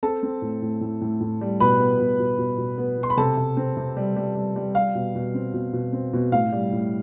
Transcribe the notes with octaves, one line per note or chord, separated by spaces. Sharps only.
C4 A4 A5
C4
A2
A2
A2
A2
A2
G3
B2 B4 B5
B3
B2
B2
B2
B2
B3
B2
C6
B5
C3 A4 A5
C3
C4
C3
G3
G3
G3
G3
G3 F5
B2
B2
C4
B2
B2
C4
B2
A2 F5
G3
A2